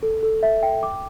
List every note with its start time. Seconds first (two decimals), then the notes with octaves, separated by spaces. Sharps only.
0.03 A4
0.23 A4
0.43 E5
0.63 G5
0.83 D6